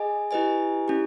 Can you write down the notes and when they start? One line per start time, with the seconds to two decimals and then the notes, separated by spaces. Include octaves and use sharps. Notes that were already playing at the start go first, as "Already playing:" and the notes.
Already playing: G#4 D#5 G#5
0.31 E4 G4 B4 D#5 G#5
0.88 C#4 E4 G4